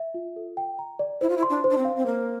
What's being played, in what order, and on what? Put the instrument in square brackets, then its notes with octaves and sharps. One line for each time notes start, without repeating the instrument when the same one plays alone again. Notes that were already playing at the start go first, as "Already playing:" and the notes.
Already playing: [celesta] E5
F4
A4
G5
A#5
D5
[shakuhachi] E4 [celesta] C5
[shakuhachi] F4
E4
[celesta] C6
[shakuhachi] D4
[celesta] C5
[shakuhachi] D4
C4
[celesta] F5
[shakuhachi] C4
[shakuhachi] A#3 [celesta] C5